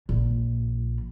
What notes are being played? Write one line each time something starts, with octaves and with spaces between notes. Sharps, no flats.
A#1